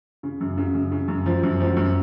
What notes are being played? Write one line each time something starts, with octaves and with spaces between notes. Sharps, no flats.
C#3
F#2
C#3
F#2
C#3
F#2
F3
F#2
F3
F#2